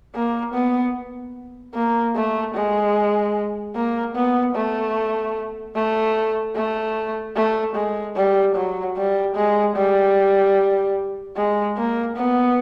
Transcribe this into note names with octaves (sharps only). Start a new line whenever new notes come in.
A#3
B3
A#3
A3
G#3
A#3
B3
A3
A3
A3
A3
G#3
G3
F#3
G3
G#3
G3
G#3
A#3
B3